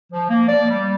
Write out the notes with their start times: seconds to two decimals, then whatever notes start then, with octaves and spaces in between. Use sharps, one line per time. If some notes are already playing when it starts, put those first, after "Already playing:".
0.13 F3
0.29 A#3
0.48 D5
0.70 G3